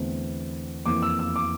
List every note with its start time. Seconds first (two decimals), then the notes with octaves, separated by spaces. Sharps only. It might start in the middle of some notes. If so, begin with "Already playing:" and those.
Already playing: E2 D3 A3 C4
0.86 F2 E3 A#3 D6
1.02 E6
1.19 E6
1.36 D6